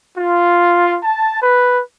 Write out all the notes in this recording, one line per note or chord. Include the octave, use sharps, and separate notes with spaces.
F4
A5
B4